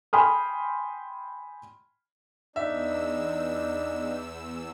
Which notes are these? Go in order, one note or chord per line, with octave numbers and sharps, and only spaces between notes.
G5 G#5 B5 C6 D#6 F6
E2 D4 D#4 E5 E6